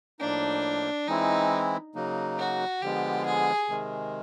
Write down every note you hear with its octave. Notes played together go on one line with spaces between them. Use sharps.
A2 F3 A#3 D4 D#4
E3 G#3 C4 D#4 E4
C#3 F#3 A#3 D#4
F#4
D3 F3 G#3 B3 G4
G#4
C3 D#3 G#3